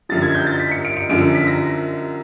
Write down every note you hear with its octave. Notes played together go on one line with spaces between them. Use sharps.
F#2 D3 F3 A6
G#6
G6
A6
B6
C#7
D7
D7
F#2 D3 F3 D7
B6
A#6